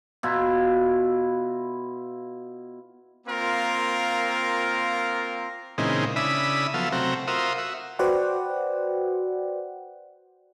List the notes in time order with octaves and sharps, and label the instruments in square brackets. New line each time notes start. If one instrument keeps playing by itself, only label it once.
[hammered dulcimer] B2 E4 F4
[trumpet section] A#3 C4 F4 A#4
[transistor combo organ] A#2 C#3 E3 G#3 C4 D#4
C#3 D4 E4 E5 B5 D#6
F3 F#3 B3 A4 E5 F5
C3 F#3 A3 C4 F#4 A#5
F4 F#4 A#4 C5 E5 D#6
F#4 E5
[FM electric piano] F#4 B4 C5 D5 F#5 G5